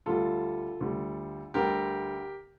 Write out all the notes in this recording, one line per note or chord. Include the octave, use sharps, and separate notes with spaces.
D2 D3 G3 F4 A4
D2 D3 G3
D2 D3 G3 G4 A#4